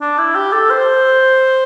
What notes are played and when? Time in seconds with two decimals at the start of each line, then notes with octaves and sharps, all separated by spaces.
0.01 D4
0.19 E4
0.35 G4
0.53 A4
0.70 C5